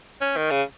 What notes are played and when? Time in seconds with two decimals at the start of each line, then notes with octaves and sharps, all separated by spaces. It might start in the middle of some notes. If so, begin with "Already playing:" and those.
0.21 C#4
0.37 D#3
0.51 C#3